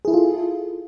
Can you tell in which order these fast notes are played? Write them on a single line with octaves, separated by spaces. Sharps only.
G#4 E4 A4 F4